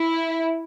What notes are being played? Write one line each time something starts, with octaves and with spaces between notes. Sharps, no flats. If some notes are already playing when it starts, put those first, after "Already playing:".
Already playing: E4